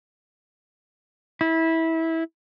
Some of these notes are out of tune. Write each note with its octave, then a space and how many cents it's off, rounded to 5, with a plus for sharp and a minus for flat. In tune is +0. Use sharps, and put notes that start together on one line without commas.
E4 -20